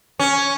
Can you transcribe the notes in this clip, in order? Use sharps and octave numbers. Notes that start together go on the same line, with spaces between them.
C#4